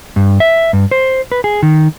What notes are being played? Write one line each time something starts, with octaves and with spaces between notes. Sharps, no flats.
G2
E5
G2
C5
B4
G#4
D#3